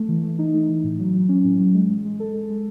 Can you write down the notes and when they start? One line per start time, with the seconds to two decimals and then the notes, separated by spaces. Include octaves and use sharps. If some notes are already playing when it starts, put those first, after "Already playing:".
Already playing: A3
0.09 E3
0.23 A3
0.39 D#4
0.53 A3
0.69 E3
0.84 A2
0.99 F#3
1.14 F#3
1.29 C#4
1.45 A2
1.60 F#3
1.74 G#3
1.90 G#3
2.05 G#3
2.20 A4
2.34 G#3
2.50 G#3